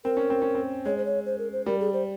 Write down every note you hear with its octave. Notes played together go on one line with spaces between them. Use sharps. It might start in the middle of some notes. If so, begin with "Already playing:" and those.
C4 A#4
C#4
C4
C#4
C4
G#3 C#5
C5
C#5
C5
A#4
C5
G3 A#4
G#4
C5